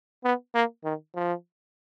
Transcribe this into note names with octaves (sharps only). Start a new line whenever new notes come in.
B3
A#3
D#3
F3